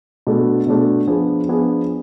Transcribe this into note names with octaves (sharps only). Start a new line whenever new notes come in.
B2 A3 D4 A4
B2 A3 D4 A4
F3 B3 D4 G#4
F3 B3 D4 G#4